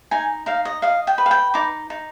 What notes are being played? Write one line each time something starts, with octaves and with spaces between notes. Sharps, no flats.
D#4 G#5
D#4 F5
D#5
D#5 F5
G5
B4
F5
G5
D#4 D6
D#4